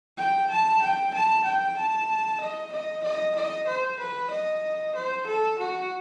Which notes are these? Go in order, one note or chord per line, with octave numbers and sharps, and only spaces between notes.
G5
A5
G5
A5
G5
A5
D#5
D#5
D#5
D#5
C5
B4
D#5
C5
A4
F#4